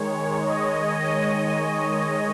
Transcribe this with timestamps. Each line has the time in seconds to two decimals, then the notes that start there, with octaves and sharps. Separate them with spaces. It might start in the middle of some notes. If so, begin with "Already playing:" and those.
Already playing: D#3 G#3 C#5
0.41 D#5